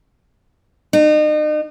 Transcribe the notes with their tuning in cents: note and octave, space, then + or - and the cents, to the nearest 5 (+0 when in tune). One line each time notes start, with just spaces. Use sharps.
D#4 -40